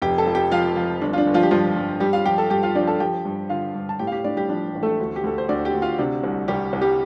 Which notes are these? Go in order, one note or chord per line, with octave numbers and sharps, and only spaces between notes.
F1 G4 G5
A4 A5
F3
G4 G5
F3 F4 F5
F3
G1 D4
F4
D4
G1
F3 F4
G4
G2 F3 F4
G2
G2 G3 G4
F4 F5
F3 G4 G5
A4 A5
G2 G4 G5
F4 F5
F3 D4 D5
A4 A5
F3 G4 G5
G2
D3 F4 F5
G2
A5
A2 G4 G5
F5
G4 G5
A2 D4 D5
G3 G4
F3 D4
A1
A3 A4
D2
G4
D2 A4
C5
D2 D4 D5
G4 G5
D2
F4 F5
C3 D4
C2
C2 G3 G4
C2
G3 G4